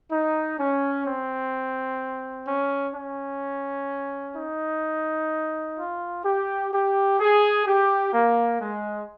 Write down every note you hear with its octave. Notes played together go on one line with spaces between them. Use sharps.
D#4
C#4
C4
C#4
C#4
D#4
F4
G4
G4
G#4
G4
A#3
G#3